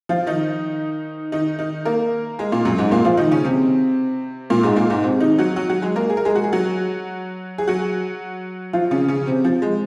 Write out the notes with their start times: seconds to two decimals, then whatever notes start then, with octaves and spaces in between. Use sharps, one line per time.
0.09 F3 F4
0.27 D#3 D#4
1.32 D#3 D#4
1.59 D#3 D#4
1.85 A#3 A#4
2.39 G#3 G#4
2.52 A#2 A#3
2.65 F#2 F#3
2.78 G#2 G#3
2.91 A#2 A#3
3.05 F3 F4
3.17 D#3 D#4
3.31 C#3 C#4
3.45 C3 C4
4.50 A#2 A#3
4.63 G#2 G#3
4.76 A#2 A#3
4.90 G#2 G#3
5.03 C3 C4
5.20 D#3 D#4
5.38 F#3 F#4
5.56 F#3 F#4
5.69 F#3 F#4
5.82 G#3 G#4
5.96 A#3 A#4
6.10 G#4
6.17 A#4
6.25 G#3 G#4
6.36 F#4
6.44 G#4
6.53 F#3 F#4
7.58 G#4
7.68 F#3 F#4
8.73 F3 F4
8.91 C#3 C#4
9.08 C#3 C#4
9.26 C3 C4
9.44 F3
9.62 G#3